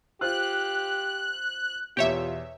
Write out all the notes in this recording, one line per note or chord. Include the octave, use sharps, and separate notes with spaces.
F4 G4 C5 F#6
E2 B2 F4 G4 C#5 E5